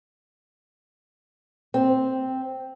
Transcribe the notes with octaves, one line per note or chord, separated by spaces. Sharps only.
C4